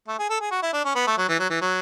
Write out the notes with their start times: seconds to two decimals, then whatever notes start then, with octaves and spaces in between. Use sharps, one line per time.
0.08 A3
0.19 G#4
0.30 A4
0.41 G#4
0.51 F#4
0.63 E4
0.73 D4
0.85 C#4
0.96 B3
1.07 A3
1.18 F#3
1.29 E3
1.40 F#3
1.50 E3
1.62 F#3